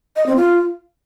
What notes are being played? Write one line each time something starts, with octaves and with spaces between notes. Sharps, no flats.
D#5
C4
F4